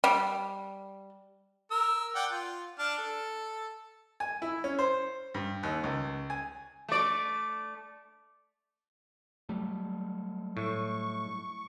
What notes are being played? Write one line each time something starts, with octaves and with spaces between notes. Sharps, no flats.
G3
A#4 E6
D5 F#5 G5
F4
D4 A5 F6
A4
G#5
E4
C#4
C5
G2
D#2
C#2
G#5
A3 D5
F#3 G3 A3
A2 C#6